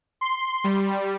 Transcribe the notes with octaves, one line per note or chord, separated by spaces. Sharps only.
C6
G3